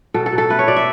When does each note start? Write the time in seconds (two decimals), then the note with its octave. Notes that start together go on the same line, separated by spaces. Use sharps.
0.14 B2 A4
0.26 A4
0.32 B2
0.38 A4
0.50 A3 B4
0.59 C#5
0.68 B2 D5
0.76 E5